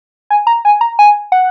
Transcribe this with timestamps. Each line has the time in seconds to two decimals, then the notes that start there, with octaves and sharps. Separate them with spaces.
0.30 G#5
0.47 A#5
0.65 G#5
0.81 A#5
0.99 G#5
1.32 F#5